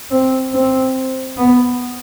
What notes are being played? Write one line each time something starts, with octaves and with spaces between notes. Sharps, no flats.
C4
C4
B3